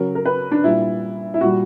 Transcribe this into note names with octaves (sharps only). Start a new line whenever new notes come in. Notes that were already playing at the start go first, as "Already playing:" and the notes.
Already playing: C#3 F#3 A#4
A#4
B4
D4
A#2 G3 E4
E4
A#2 G3 F#4